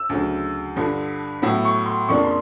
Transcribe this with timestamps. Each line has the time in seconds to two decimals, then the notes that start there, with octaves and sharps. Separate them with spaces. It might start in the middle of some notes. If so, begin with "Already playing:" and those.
Already playing: E6
0.09 D2 C#3 F#3
0.76 G2 D3 F3
1.42 A2 F#3 B3 E4
1.65 C#6
1.86 C6
2.08 F2 C#3 F3 A#3 D4 C#6
2.25 C6